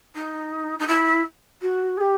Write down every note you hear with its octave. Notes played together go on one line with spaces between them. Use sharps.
D#4
D#4
E4
F#4
G#4
G4